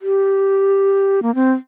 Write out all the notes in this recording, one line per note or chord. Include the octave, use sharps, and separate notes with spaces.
G4
A#3
C4